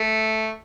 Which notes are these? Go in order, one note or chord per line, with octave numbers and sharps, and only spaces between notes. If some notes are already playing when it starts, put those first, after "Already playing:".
Already playing: A3